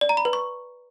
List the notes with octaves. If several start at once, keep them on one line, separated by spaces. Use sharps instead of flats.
D5
A#5
B5
B4
C#6